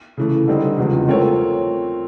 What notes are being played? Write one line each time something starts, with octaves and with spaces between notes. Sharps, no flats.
C#3 E3 A3
D3 G3 C4 D#4
E2 C#3 F3 G#3
A3 C4 F4 A#4 C#5